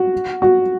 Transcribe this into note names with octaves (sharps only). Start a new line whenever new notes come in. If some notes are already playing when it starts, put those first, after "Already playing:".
Already playing: F#4
F#4